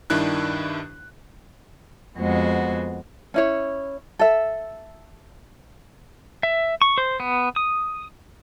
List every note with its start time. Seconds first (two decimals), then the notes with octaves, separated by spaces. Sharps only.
0.10 G2 D#3 D4 E4 F#6
2.17 F2 G#3 B3 F#4 C5
3.34 C#4 E4 C#5
4.19 A4 E5
6.43 E5
6.82 C#6
6.98 C5
7.20 B3
7.56 D#6